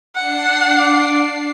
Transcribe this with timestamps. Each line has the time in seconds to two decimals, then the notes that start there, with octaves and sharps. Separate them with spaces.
0.15 D4 F#5 C7
0.79 D6